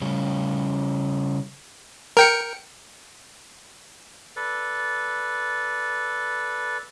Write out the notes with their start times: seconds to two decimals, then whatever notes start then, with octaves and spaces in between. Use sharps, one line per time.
0.01 C#3 G3 C#4
2.17 A#4 G5 C#7
4.36 A4 B4 D5